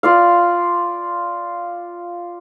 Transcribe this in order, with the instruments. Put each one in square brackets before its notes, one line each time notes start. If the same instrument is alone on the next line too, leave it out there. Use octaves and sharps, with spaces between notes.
[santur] F4 D5 F5